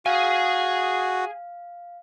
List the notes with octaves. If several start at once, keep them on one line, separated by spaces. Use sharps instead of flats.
F#4 G#4 F5 G#5